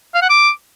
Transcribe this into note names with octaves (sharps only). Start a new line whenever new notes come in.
F5
F#5
D6